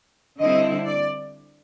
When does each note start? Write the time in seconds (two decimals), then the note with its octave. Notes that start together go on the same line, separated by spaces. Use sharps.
0.40 D3 G3 C4 E4 D#5
0.87 D5